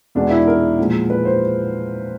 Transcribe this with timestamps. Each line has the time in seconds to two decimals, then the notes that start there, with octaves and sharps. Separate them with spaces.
0.15 E2 B2 G#3 D4
0.31 E4
0.47 A#4
0.79 A#2 F3 G#3
1.10 B4
1.25 C5